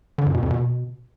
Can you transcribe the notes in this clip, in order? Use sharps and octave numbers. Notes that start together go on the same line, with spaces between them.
D3
F#2
B2
F2
B2